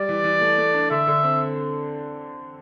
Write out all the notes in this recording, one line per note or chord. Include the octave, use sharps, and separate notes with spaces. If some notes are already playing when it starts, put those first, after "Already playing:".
Already playing: G3 D5
E3
E3
A3
A3
D4
D3 E5
D3
C4